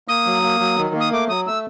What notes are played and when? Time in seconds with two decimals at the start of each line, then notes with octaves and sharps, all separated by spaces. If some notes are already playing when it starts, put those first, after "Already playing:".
0.08 A#3 D#6
0.26 F#3
0.43 A#3
0.60 F#3
0.78 D#3
0.94 A#3
1.00 D#6
1.12 A3 D6
1.29 F#3 D#6
1.47 A3 E6